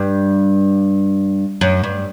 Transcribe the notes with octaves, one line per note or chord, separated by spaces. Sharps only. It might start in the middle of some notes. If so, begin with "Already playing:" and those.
Already playing: G2
F#2
G2